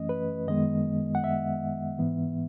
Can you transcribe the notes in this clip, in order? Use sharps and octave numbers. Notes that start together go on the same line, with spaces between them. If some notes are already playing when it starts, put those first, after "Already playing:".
Already playing: F#2 E3 A3 C#4 D#5
B4
F#2 D#3 G#3 B3 D#5
F#5
E5
G#2 E3 B3